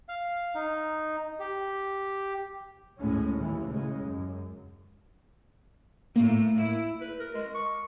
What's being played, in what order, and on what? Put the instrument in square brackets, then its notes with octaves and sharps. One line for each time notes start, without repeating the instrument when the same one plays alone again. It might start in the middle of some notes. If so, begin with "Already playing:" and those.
[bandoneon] F5
D#4
G4
[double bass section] D2 A2 G#3 C#4
D#2 E3
A2 C#3 G#3
F#2
[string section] A2 [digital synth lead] A#3
[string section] E4
[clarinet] B4
A#4
G#3
C#6